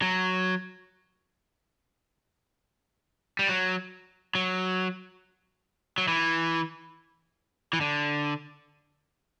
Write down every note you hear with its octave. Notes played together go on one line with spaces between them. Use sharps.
F#3
G3
F#3
F#3
F#3
E3
E3
D3